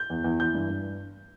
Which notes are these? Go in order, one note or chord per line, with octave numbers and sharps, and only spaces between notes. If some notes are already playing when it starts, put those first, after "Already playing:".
Already playing: G6
E2
E2
E3 G6
G2
G2